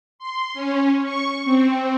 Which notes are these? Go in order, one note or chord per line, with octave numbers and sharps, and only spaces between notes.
C6
C#4
C#6
C4